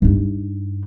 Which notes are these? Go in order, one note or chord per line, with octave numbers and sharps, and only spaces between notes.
G2 D#4